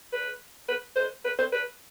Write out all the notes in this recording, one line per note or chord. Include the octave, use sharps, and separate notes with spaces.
B4
B4
C5
B4
C5
B4